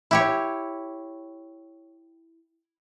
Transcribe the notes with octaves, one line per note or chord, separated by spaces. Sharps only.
E4 G4 C#5